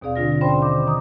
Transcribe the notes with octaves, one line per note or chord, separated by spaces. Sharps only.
D#2 B2 C4 G#4 D5 F5
B2 D3 D4 F4 A#6
C#4 C5 D5 G5 B5 C6
D#3 D6
D#3 A#5 D#6